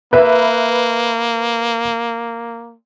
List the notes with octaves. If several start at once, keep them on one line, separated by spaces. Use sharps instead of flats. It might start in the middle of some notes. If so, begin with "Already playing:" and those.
A#3 B4 E5